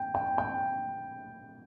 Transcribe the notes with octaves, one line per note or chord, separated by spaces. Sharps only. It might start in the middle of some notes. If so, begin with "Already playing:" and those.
Already playing: G5
G5
G5